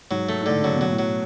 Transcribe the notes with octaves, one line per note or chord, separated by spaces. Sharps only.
G#2 F#3
A3
G#2
A2 D3
C#3 F#3
B2 F#3
A2
F#3